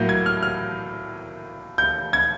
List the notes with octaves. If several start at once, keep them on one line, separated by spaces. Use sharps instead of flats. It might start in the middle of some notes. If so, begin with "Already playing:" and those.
Already playing: A2 F#3 A#3 G6
G#6
F6
F6
G6
G#6